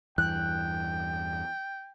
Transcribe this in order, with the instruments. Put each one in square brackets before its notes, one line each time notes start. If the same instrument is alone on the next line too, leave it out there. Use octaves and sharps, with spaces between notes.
[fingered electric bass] E2 G2 E3 [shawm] G5 [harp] F#6